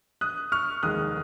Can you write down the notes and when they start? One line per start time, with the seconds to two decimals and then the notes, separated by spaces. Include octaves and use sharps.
0.21 D#6 F#6
0.52 C#6 F6
0.83 F1 D#2 D#3 G#3 D#6 F#6